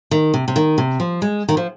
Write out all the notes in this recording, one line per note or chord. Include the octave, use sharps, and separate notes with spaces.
D#3
C3
C3
D#3
C3
F3
G#3
D#3
F3